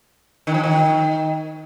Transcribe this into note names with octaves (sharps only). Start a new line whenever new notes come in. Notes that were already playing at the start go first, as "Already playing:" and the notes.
D#3
F3
D#3